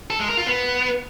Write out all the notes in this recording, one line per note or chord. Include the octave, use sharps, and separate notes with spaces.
A4
G#3
A#4
F4
B3